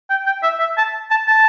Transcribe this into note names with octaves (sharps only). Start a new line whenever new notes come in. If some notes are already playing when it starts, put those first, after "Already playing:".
G5
G5
E5
E5
A5
A5
A5